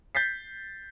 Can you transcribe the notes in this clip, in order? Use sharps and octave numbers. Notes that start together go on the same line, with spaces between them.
G6 A6 B6 C7